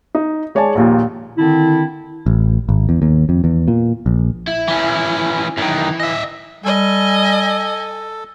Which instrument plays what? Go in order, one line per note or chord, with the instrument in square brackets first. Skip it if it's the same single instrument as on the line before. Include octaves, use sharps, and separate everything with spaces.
[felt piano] D#4
G#3 C#5 D5 G#5 A5
A#1 D#2 A#2
[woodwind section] D3 D#3 C4 D4 E4
[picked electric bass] A1
G#1
E2
D#2
F2
E2
A#2
A#1
[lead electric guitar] E4
[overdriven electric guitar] E3 C#4
[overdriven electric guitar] F#2 D#3 [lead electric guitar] E3
[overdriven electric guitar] D#5 E5
[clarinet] G3 [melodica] A4 [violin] D#5 G#5